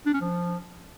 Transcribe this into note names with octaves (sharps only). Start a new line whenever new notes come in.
D4
C#4
F3